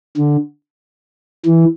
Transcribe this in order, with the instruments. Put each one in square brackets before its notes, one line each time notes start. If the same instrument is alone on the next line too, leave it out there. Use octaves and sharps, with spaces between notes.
[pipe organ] D3
E3